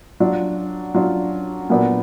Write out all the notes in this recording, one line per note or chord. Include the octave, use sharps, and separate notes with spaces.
F#3 D4 F4
F#3 D4 F4
A#2 F#3 B3 D4